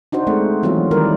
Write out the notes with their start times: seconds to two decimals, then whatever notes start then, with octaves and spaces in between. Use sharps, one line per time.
0.12 D4 D#4 F#4 C5
0.27 G#3 A3 C4
0.63 E3 F#3 B3 C4 F4 F#4
0.91 D#3 G3 E4 A#4 D5